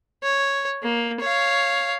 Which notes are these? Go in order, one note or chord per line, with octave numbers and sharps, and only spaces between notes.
C#5
A#3
C#5 F5